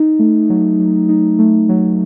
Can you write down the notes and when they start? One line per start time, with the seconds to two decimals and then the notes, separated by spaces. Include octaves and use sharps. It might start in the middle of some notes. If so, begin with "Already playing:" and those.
Already playing: D#4
0.19 A3
0.50 F#3
0.79 F#3
1.09 D#4
1.39 A3
1.69 F#3